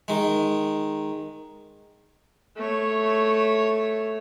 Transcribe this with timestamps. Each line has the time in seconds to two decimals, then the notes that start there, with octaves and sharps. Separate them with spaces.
0.08 D#3 G#3
2.56 A3 C#5